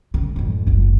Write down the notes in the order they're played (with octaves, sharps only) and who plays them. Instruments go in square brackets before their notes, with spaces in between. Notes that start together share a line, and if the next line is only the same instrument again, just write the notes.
[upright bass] C#3
F2 G#2
F#1 C#2